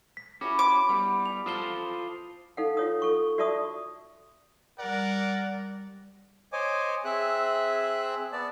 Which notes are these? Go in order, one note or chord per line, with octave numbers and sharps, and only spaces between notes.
B6
C#4 E4 F#4 G4 B4 D6
B5 D6
G3 B3
G#5 C6 F7
F4 A4 C5 D#6 G7
D#4 A4 F5 F#5
F4 C#5 D#6
A4 C#6
F#4 D5 E5 A5 C#6 D#6
G3 A#4 D5 F#5
C5 C#5 D#5 G#5 D6
C4 G#4 E5 F#6
B3 D5 A5